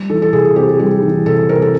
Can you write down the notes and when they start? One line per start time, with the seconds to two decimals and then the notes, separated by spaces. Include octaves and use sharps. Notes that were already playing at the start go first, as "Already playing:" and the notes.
Already playing: G3
0.10 E3 A4
0.22 A4
0.33 C3 G#4
0.56 C4 G4
0.79 G3 G4
1.02 E3
1.26 C3 A4
1.49 C4 A#4
1.62 A4